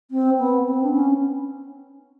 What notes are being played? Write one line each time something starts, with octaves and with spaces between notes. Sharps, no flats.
C4
B3
C4
D4
C#4